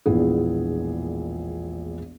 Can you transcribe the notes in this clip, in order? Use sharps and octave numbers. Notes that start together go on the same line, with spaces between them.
E1 A#1 A#2 B3 E4 G#4